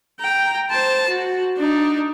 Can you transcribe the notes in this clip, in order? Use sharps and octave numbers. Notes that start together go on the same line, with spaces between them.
G5 A#5
C5 A5
F#4
D4 D#4